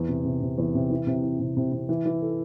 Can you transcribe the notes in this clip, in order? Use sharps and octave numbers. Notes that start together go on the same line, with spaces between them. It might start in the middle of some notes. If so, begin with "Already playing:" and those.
Already playing: E2
C3
C3
C3
E2
C3
E3
C3
E3
C3
C3
C3
E3
E3
A4